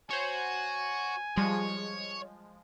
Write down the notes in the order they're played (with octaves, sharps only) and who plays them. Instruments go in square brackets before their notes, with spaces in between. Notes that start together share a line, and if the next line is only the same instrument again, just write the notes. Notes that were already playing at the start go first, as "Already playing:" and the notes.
[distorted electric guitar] F#4 [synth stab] C5 C#5 [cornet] G#5
[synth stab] F3 G#3 [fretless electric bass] G3 [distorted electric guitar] C#5